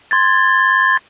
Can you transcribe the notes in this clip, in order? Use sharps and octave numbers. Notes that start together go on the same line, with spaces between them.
C6 G#6 A6